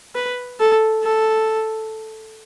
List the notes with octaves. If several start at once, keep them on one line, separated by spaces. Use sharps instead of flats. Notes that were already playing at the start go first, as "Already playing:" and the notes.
B4
A4
A4